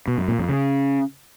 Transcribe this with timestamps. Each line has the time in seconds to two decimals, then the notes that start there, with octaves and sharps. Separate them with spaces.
0.08 B2
0.18 F#2
0.28 A#2
0.38 F2
0.49 C#3